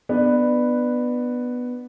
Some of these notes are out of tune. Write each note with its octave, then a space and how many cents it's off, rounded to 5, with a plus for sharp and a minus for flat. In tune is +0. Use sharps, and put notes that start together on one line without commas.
B3 +0 D4 +25 B4 +0